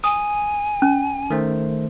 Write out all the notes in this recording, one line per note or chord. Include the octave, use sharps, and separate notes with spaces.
G#5 D#6
C#4
D#3 A3 C5